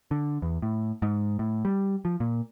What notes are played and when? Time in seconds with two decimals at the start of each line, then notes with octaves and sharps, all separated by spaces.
0.11 D3
0.42 E2
0.62 A2
1.02 G#2
1.39 A2
1.65 G3
2.05 F3
2.20 A#2